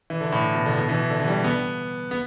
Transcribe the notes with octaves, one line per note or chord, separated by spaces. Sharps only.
E3
D3
A2
B2
D3
B2
E3
D3
E3
G3
B3
B3